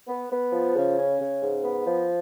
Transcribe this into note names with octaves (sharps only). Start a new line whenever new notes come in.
B3
B3
F3
C#3
C#4
C#3
G#2
B3
F3